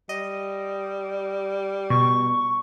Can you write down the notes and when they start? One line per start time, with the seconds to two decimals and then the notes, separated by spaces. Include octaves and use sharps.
0.09 G3 D#5
1.90 B2 C#6